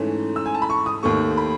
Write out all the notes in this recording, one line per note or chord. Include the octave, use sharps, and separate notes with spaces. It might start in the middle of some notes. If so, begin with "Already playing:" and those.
Already playing: G#2 E3 A3 C#4
E6
G#5
A5
B5
C#6
D#6
D#2 D#3 A3 C#6
B5